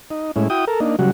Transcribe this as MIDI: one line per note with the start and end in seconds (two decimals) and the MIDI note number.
0.10 0.31 63
0.36 0.48 45
0.36 0.48 56
0.36 0.48 61
0.36 0.48 64
0.50 0.65 64
0.50 0.65 66
0.50 0.65 79
0.50 0.65 87
0.67 0.80 69
0.67 0.80 70
0.80 0.96 58
0.80 0.96 62
0.80 0.96 63
0.99 1.11 49
0.99 1.11 54
0.99 1.11 55
0.99 1.11 66